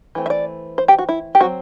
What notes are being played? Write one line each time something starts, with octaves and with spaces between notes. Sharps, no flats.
E3 A3 C4
E5
D5
C5
G4
F#4
E4
G4
F#3 C4 F#4